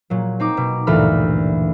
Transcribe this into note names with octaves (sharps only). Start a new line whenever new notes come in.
A#2 F#3
C4 D#4 D6
B2
D2 G2 A#2 E3 B5 F6